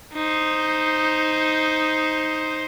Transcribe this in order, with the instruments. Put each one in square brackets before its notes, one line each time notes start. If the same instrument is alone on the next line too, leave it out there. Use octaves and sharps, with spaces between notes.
[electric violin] D#4 C5